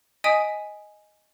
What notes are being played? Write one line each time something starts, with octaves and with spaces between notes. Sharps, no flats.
D#5 G#5 D#6 B6 D7 D#7